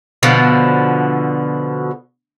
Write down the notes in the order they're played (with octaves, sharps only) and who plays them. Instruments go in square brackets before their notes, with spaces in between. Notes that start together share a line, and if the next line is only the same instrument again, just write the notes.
[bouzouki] B2 D3 F3